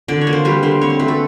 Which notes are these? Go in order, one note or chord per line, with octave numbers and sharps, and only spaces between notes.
D3 D5
C#5
A#3
C5
G3 B4
D3 C5
C4 C#5
C5
A3 B4
A4